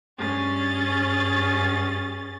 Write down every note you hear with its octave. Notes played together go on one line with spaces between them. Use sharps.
G2 C#4 G#4 A6